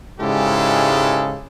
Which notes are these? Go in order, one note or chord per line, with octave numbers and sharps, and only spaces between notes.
G#2 C#3 G#3 E4 G4 A4